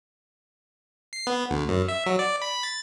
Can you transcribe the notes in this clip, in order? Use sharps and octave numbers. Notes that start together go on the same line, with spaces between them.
C7
B3
D2
F#2
E5
F#3
D5
B5
A6